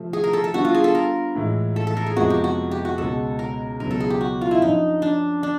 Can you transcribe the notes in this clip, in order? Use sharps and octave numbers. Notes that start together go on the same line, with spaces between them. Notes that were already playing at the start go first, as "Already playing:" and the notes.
Already playing: C3 F3 A3 C4
G#4
A#4
A4
A4
D3 G3 B3 D4 F#4 G4
F4
G#4
A4
A#4
A2 E3 G#3
A4
A4
A#4
G#4
F2 C3 F3 G#3 B3 F#4
G4
F#4
G4
F#4
C#2 B2 G#3 A4
A#4
C#2 B2 F#3 B3 A#4
A4
G#4
G4
F#4
F4
E4
F#2 D3 F3 D#4
D4
D4